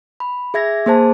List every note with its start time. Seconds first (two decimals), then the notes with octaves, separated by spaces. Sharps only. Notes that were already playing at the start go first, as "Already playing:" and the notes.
0.20 B5
0.54 G#4 E5 G#6 A#6
0.86 A#3 G#4 C5 A5